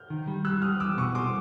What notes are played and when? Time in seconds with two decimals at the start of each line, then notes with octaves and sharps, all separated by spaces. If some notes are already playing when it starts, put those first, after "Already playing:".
Already playing: F6 G6
0.10 D#3
0.27 G3
0.45 G3 E6 F#6
0.62 G3 D#6 F6
0.80 E2 D6 E6
0.97 B2 C#6 D#6
1.15 G3 C6 D6